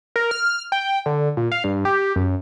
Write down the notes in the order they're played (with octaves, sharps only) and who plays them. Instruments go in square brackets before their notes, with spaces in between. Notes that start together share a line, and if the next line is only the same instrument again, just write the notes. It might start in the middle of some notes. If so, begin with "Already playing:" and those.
[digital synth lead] A#4
F6
G5
D3
A#2
F5
G2
G4
F#2